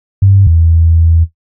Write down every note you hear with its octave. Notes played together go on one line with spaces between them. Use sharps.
G2
E2